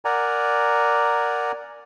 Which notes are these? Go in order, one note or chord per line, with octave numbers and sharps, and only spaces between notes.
A#4 D5 F#5 G#5 A#5